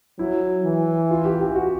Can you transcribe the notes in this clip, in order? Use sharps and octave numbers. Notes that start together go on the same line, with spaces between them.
F#3 E4
E3
F4
G4
G4
F#4